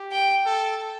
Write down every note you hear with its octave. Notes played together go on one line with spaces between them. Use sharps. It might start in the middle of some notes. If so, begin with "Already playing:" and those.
Already playing: G4
G5
A4